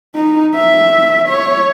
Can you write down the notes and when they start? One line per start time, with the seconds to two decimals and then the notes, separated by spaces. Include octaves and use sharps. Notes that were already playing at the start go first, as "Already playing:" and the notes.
0.15 D#4
0.55 E5
1.29 C#5